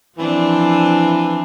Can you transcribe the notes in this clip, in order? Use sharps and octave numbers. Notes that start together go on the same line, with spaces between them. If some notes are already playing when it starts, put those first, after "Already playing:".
E3 F3 C4 D4